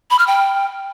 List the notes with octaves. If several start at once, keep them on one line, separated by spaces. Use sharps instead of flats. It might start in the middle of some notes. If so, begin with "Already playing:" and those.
B5
F6
G5